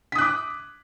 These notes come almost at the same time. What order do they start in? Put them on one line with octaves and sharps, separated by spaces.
B6 D#6 F#6 D6